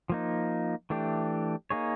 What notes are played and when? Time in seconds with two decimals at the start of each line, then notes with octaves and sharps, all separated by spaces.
0.10 F3 A#3 D#4
0.90 E3 A3 D4 G4
1.70 A#3 D#4 G#4 C#5